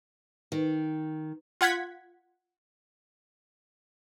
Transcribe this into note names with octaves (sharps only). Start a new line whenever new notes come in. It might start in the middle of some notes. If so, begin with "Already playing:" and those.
D#3
F4 F#5 G#6 B6